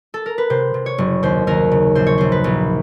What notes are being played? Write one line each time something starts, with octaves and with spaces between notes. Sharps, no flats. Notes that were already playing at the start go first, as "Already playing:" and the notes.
A4
A#4
B4
C3 C5
C3
C#5
F#1
D#2 C5
D#2 A#4
C#3
A#1 C5
C#5
A#1 C5
B4
A#1